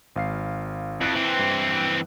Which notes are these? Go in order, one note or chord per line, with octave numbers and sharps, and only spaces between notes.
G#1 F5 C7
F2 E4 F#6 D7
E3 C4
G2